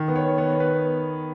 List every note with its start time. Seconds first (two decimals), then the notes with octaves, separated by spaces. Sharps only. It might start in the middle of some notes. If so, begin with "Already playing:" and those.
Already playing: D#3
0.08 B3
0.16 C#5
0.23 B3
0.38 B3 C#5
0.52 B3
0.60 B4